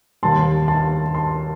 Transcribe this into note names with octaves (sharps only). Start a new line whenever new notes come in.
D#2 D#3 G3 A5 C6
A5 C6
A5 C6